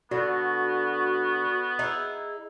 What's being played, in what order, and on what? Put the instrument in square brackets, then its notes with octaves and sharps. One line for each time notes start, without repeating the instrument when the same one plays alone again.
[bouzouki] D3 [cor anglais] B3 [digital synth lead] F#4
[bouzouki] D#4 E4 G#4